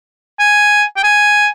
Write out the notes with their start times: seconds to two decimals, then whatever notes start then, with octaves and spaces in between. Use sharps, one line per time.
0.40 G#5
0.97 G5
1.04 G#5